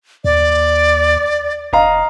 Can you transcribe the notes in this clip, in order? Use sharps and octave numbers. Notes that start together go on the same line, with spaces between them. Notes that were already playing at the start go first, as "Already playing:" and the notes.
D#2 D5
F1 D#5 F5 A#5